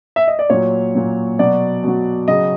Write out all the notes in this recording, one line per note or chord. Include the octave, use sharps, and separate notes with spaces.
E5
D#5
D5
A#2 F#3 C#5
A#2 F#3
B2 F#3 D5
B2 F#3
C#3 F#3 D#5